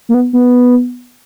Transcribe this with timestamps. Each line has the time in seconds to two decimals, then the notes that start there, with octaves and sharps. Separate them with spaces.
0.09 A#3
0.14 B3
0.33 B3